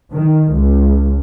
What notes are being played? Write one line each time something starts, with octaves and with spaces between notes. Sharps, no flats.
D#3
C#2